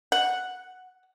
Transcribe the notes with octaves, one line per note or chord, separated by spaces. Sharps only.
F#5